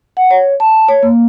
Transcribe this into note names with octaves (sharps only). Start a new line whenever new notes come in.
F#5
C#5
A5
C#5
A#3